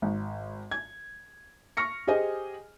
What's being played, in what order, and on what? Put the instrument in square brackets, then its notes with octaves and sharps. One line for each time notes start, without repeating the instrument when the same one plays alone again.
[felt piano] G#1
G#6
C#6 F6 A#6 C#7
G4 G#4 C5 D#5 G#5